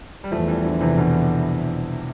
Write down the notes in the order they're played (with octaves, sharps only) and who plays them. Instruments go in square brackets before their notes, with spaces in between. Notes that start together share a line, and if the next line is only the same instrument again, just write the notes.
[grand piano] G3
[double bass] E2 [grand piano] F3 A3
[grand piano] E3 G3
D3 F3
C3 E3
B2 D3